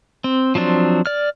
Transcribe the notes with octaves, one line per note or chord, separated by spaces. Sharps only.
C4
F3 F#3 C4 D4
D5 F6